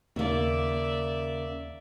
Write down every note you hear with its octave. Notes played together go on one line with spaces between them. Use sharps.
D#2 C#3 A#3 D5 E5